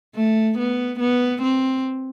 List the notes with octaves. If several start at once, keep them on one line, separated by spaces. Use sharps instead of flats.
A3
B3
B3
C4